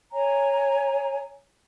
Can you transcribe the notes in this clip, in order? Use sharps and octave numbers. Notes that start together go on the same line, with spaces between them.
C#5 G#5 A#5